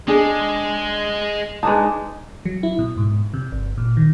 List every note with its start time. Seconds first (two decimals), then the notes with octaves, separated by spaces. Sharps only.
0.08 G#3 D4 G#4
1.63 G#3 D4 D#4 B4 A5
2.45 F#3
2.63 E4
2.79 B2
2.97 G#2
3.34 C3
3.52 G1
3.78 A#2
3.97 D#3